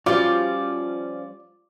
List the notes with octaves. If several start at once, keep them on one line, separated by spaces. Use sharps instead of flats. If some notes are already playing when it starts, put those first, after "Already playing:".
F3 G3 C#4 F4 F#4 D5